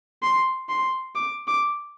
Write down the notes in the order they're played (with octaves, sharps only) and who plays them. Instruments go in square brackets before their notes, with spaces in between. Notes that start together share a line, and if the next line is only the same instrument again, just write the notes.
[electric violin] C6
C6
D6
D6